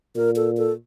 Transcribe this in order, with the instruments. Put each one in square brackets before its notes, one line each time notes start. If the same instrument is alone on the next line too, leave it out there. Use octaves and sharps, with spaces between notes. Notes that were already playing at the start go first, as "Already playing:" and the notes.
[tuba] A#2 [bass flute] A#4
[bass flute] A4
A4